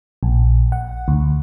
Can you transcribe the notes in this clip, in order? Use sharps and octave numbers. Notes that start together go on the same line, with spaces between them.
A#1
F#5
D2